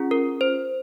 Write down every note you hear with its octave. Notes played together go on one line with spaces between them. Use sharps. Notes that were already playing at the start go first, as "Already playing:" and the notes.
Already playing: C#4 F4 G#4
A#4
C5